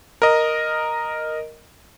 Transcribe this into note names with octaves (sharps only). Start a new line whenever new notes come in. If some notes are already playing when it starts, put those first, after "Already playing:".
A#4 D#5